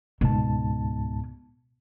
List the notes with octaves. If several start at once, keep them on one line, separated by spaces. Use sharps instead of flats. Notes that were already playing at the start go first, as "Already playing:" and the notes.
C#2 G#2 B2 A5